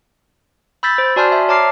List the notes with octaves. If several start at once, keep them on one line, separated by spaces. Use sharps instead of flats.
B5 E6 G6 A6 B6
C5
F#4 D5 G#5 A5 C6 F6
E5
C#5 A5 A#5 D6 F6 C7